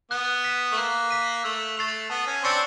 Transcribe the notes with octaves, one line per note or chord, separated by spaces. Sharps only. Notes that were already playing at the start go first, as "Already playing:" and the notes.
B3 F#6
B6
E7
A3
A#3 F#6
B6 D#7
A3 E6
A3 A6 C7 F7
B3 A5
C#4
C4 D4 C#6 E6 A6 C#7